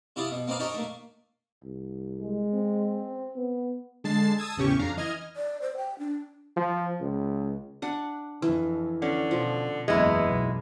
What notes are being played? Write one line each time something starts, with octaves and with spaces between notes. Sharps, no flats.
C3 E4 F4 D5 D#6
B2
A#3 C4 D#4 B4 D5 F5
D4 D#4 G4 A#4 C#5
A3 A#3
C2
G#3
C4
B3
D3 G#3 A5 A6 C7
A5 D#6 E6 G#6
A1 E2 C#3 C#4 G4 C#6
F2 D4 F5 A#5
E3 D#5 F6 G#6
D5
C5
G5
D4
F3
C#2
D4 F#5
F2 E3
D3 C#4
B2 F3
F#1 E2 G#3 B3 E4
B1